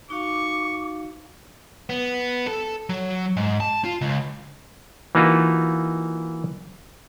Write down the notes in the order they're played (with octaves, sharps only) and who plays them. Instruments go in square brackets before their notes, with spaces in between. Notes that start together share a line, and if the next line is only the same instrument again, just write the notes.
[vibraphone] D#4 F#4 F5 [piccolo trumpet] C#6 [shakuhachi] D6
[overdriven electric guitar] B3
A4
F#3
G#2
A5
F4
C#2
[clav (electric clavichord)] E3 A#3 D#4 F4 F#4 B4